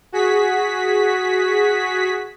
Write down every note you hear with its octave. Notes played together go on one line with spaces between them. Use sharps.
F#4 G#4 B6